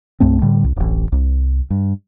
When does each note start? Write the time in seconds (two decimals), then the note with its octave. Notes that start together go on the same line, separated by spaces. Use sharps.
0.20 C2 G2 A3 C4
0.42 A2 D3 G3
0.64 C2
0.76 D1 A1
1.12 C2
1.70 G2